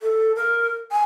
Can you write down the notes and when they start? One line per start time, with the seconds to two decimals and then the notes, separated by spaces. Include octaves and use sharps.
0.01 A4
0.36 A#4
0.91 G#5